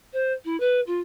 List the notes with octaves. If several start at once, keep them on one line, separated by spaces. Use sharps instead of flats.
C5
E4
B4
F4